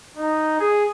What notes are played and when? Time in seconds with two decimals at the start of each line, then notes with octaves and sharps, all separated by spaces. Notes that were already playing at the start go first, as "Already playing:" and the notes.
0.17 D#4
0.60 G#4